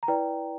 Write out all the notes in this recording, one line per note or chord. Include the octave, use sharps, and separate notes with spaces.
A#5
E4 B4 D5 G5